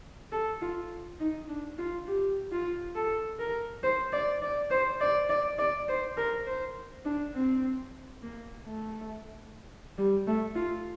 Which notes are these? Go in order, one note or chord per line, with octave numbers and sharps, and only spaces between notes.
A4
F4
D#4
D4
F4
G4
F4
A4
A#4
C5
D5
D5
C5
D5
D5
D5
C5
A#4
C5
D4
C4
A#3
A3
G3
A3
F4